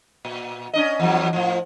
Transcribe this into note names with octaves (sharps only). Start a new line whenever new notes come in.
A#2
C#4 D4 D#5
E2 F3 F#3
A2 F3